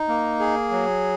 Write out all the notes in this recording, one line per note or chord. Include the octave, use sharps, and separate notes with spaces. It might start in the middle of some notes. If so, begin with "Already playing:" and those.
Already playing: D#4
A#3
G#4
F#3